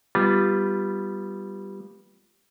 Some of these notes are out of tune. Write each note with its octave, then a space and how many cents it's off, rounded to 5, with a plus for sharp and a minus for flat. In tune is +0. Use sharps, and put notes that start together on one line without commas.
G3 +0 B3 +0 F4 +0